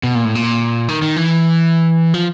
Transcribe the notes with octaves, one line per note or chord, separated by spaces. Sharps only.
B2
A#2
A2
A#2
D#3
D#3
E3
F3